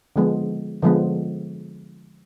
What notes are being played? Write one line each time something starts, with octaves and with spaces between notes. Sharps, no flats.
D3 F3 G#3 B3
D3 F3 G#3 B3